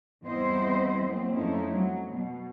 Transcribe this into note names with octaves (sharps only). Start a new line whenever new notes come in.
E2 G3 C4 E4 C5 D#5
F#3 A#3 C4
F2 F3 A3 C#4 D#4 E4
F#3
B2